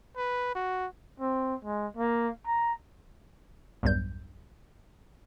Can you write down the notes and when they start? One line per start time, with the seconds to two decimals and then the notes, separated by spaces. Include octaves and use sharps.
0.17 B4
0.55 F#4
1.20 C4
1.65 G#3
1.97 A#3
2.46 A#5
3.83 B1 E2 G2 G3 G6